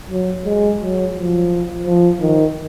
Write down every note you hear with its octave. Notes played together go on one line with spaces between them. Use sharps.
F#3
G#3
F#3
F3
F3
D#3